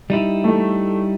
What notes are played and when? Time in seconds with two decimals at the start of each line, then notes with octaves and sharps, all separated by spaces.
0.10 G3 D#4 E4
0.44 A3